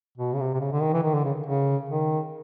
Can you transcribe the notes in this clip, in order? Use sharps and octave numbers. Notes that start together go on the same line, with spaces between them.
B2
C#3
C3
C3
C#3
D3
D#3
E3
D#3
D3
C#3
C#3
D#3